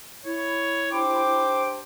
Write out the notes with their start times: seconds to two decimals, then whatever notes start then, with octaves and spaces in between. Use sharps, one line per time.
0.25 E4 C#5
0.92 D4 G4 C5 G5 D6